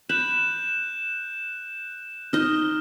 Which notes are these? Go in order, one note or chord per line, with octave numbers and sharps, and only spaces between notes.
B5 F#6 G6 E7
D#4 D#5 F6